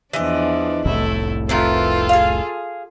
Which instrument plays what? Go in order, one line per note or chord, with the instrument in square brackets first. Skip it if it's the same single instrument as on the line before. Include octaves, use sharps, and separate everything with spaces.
[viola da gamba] E2 F3 D4 [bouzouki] E3 D#5
[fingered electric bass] F1 C2 A2 [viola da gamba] A3 E4
[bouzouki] D#3 E3 C4 [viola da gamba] F4 A4
[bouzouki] G#4 F5